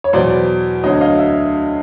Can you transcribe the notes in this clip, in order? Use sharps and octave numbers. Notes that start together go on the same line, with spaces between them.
C#5
E2 B2 F#3 C5 D5
D2 D3 F#3 C#5 D#5
D#5 F5
E5